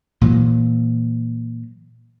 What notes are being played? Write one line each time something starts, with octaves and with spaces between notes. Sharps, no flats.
A#2 E3 F#3